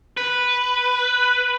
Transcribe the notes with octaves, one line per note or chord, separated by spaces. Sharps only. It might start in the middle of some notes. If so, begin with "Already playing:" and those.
B4